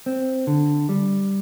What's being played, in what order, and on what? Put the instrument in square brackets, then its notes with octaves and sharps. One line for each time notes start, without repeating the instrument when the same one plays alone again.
[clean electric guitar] C4
D3
G3